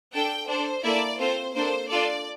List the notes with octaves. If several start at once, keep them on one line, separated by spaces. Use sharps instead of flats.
D4 A4 G5
D4 A4 C5
A#3 E4 A4 D5
C4 F4 A4 C5
A#3 D4 A4 C5
D4 F4 A4 D5